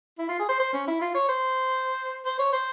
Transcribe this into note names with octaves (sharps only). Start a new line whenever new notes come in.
E4
F4
G#4
C5
C5
C#4
E4
F4
C#5
C5
C5
C#5
C5